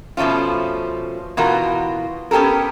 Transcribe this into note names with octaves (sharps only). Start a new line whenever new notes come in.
B2 F3 A3 C#4 F4
B2 E3 F4 F#4 A#4
B3 C#4 G4 A4 A#4